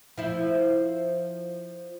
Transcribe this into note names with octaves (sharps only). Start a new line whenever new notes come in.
F3 E4